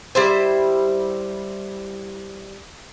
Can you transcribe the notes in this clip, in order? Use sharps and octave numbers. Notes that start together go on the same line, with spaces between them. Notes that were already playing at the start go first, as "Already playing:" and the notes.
G3 E4 C5